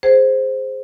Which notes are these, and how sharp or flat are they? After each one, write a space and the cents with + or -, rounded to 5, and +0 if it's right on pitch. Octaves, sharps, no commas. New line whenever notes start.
G#4 +0 C5 +0